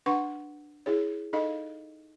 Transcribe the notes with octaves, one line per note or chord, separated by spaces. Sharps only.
D4 B4 F#5 C6 C#6
E4 G#4 C#5
D#4 A4 D#5 F5